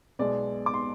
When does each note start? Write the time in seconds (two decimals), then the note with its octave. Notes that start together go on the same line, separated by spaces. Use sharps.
0.19 B1 B2 G#3 D5
0.66 D6
0.74 C6